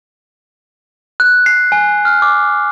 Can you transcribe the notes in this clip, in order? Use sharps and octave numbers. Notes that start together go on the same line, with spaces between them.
F#6
C7
G#5
F6
D6